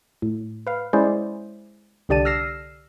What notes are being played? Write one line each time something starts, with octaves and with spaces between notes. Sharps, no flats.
A2
B4 F5
G#3 C#4 E4 G#4 C5 D5
C2 D3 G4 D5 A5 D#7
E6 F6 A#6 C7 E7